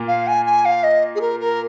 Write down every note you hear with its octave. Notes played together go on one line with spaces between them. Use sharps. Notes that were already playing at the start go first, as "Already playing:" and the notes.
Already playing: A#2 A#3 F4
F5
G#5
G#5
F5
D#5
G#4
A#4
A#4